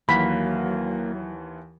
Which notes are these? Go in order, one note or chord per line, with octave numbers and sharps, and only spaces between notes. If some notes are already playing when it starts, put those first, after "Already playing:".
D#2 E3 F#3 A#3 F#5 B5